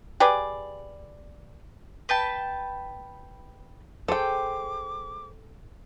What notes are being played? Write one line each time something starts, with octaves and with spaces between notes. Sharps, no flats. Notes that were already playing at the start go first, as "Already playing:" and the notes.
G4 G#4 B4 D5
B4 G5 A5
G#4 A4 C5 G5 D6